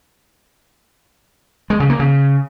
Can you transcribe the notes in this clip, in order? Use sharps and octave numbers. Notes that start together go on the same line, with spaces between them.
G#3
C#3
A#3
C#3